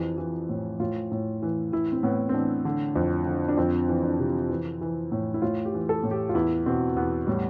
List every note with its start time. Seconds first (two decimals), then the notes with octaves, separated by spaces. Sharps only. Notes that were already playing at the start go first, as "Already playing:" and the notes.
Already playing: F2 E3 G4
0.18 E3
0.49 A2
0.80 A2 F4
1.12 A2
1.42 E3
1.72 E3 E4
1.92 C4
2.03 A2 B3
2.29 C4
2.34 E3 D4
2.65 D3
2.95 F2
3.26 D3
3.48 D4
3.57 F2 C4
3.89 E3
4.03 D4
4.19 C3
4.49 E3
4.81 E3
5.12 A2
5.34 E4
5.42 A2 F4
5.65 G4
5.74 E3
5.89 A4
6.04 A2
6.11 G4
6.29 F4
6.34 E2 E4
6.66 B2 C4
6.96 E2 B3
7.27 A2 G3